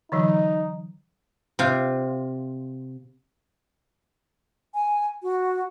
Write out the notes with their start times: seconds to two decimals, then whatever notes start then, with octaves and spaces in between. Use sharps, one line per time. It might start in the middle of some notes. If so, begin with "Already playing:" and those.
0.12 D3 E3 F#3 D#4
1.59 C3 F4
4.74 G#5
5.23 F#4